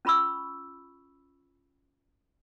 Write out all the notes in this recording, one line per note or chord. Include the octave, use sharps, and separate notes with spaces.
C#4 F4 B5 C#6 E6